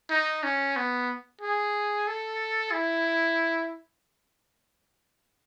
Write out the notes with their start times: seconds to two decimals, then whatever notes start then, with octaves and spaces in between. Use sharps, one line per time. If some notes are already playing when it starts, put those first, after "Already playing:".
0.10 D#4
0.44 C#4
0.76 B3
1.41 G#4
2.07 A4
2.72 E4